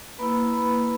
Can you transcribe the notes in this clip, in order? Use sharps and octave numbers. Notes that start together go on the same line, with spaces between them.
A#3 E4 B4 B5
B4 B5